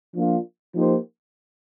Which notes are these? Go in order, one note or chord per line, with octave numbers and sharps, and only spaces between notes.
F3 A#3 D4 F4
F3 A#3 D#4 G4 C5